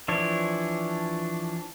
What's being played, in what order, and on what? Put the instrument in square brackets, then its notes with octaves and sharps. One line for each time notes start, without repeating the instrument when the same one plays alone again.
[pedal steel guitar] E3 F3 D4 C#5